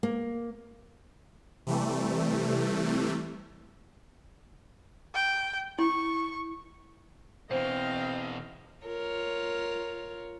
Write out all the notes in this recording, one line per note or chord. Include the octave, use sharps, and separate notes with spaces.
A#3
C3 E3 G3 A3
G5
E4 C#6
B2 E3 C4 C5 D#5 F5
F4 A#4 C#5